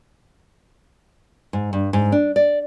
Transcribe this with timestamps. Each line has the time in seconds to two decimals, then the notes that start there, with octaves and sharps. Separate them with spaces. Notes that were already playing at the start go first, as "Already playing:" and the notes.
1.53 G#2
1.73 G2
1.93 G#2
2.12 D4
2.36 D5